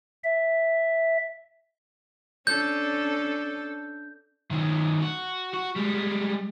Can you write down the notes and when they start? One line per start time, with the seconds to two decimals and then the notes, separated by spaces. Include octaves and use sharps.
0.24 E5
2.47 C#4 D4 A4 G6
4.51 D#3 F#3
5.02 F#4
5.54 F#4
5.76 G3 G#3